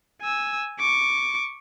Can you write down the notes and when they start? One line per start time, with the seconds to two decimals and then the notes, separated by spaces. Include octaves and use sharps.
0.22 G#5 E6
0.79 C#6 D6